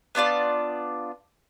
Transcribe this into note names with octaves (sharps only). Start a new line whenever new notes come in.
B3 D4 F4 D5